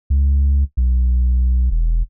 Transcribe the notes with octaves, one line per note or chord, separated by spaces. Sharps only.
C#2
B1
E1